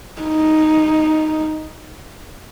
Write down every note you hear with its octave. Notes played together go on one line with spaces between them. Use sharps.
D#4